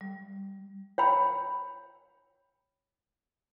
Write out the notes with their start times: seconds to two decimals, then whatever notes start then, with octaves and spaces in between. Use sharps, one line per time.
0.01 G3
0.98 C#5 G5 B5